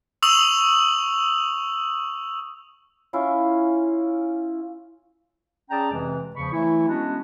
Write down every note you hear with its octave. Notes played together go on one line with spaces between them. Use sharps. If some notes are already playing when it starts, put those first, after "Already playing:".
C#6 D#6 E6 F7 F#7
C#4 E4 F4
C#4 G#4 D5 G5 A5 A#5
F2 C3 E3 G#3
E2 C#3 F3 B5 C#6
E3 F#3 A3 E4
G#3 B3 C#4 D4 F#4